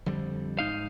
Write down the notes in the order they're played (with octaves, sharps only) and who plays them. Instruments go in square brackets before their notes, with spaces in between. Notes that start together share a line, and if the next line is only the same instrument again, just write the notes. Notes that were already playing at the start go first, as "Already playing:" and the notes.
[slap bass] F2 D3 G3
[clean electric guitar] G#2 D#4 F5